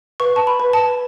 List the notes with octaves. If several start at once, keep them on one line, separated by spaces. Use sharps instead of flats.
B4 C#6
A5
B5
B4
A5